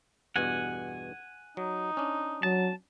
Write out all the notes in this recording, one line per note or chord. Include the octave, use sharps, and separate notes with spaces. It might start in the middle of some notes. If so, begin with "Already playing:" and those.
E2 G2 B2 F#5 G#5
F#3 D#4
C#4 D4
F#3 A5